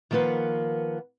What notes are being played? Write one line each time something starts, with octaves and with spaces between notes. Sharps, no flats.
D#3 F3 A#3 B3 B4 F#5